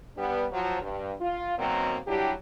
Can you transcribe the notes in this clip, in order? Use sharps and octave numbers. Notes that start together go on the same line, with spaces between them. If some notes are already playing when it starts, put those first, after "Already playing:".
G3 B3 D4
F3 F#3
G2
F4
B2 D#3 F#3 A#3 C4
F#3 G3 D4 E4 G4